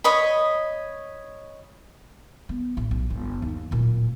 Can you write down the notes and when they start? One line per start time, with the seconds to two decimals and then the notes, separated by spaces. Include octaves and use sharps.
0.04 C#5 D#5 B5
2.49 B3
2.77 A1
2.91 B1
3.10 G1
3.42 D#2
3.71 D1 A#2